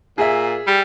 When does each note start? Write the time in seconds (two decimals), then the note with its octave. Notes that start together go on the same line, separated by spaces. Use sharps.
0.18 A#2 G#4 E5
0.67 G3